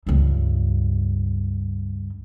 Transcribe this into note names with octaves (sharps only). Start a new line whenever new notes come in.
C#2 G2